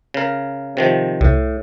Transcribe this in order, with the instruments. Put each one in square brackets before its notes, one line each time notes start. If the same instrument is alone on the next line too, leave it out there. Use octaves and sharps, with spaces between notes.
[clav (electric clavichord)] C#3 A#4
C3 D#3 F3
[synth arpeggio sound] C2 [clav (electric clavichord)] A2